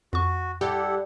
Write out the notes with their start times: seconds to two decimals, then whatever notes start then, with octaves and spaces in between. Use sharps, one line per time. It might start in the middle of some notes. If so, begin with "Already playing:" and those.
0.13 F2 F#4 C#6
0.61 G3 E4 G4 A4 F#5